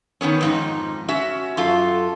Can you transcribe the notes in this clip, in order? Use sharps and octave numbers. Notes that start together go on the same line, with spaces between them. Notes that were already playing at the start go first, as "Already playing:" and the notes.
D#3 E3 B3 C#4
F2 G#2 D#4
C#4 F#4 E5
F#2 F4 A4